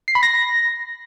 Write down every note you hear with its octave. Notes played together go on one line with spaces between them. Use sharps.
C7
B5
A#6